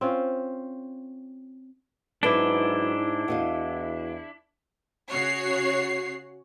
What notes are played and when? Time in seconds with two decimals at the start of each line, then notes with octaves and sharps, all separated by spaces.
0.01 C4 C#4 F4
2.23 G#2 F#3 B3 D4 E4 B4 D6 G7
3.28 E2 F#4 D#5 F5
5.11 C#3 F#4 C#5 C7